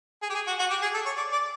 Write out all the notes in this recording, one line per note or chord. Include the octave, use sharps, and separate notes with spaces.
G#4
G4
G#4
F#4
F#4
G4
G#4
A4
C#5
D5
D5